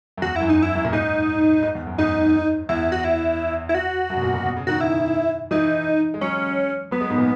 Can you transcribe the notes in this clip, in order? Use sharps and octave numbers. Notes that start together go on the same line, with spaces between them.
F#2
E2 F#4
F#2 E4
D#4
E4
F#2
A#2
G#2 D#4
G#2
E2
F#2
G#2 D#4
E2 E4
F#4
E4
E4
F#4
F#2
B2
A#2
A#2
B2
C#3
D#3 F#4
E4
E3 D#4
G#3
F#3 C#4
F#3 B3
G#3
G#2
A#2